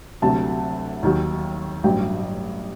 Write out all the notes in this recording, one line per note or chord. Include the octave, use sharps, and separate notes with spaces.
D2 C3 F#3 A5
D#2 D#3 F#3
A1 G2 F#3 G5